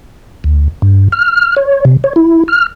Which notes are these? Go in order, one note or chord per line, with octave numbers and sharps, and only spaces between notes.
D2
G2
F6
C#5
C3
C#5
E4
F6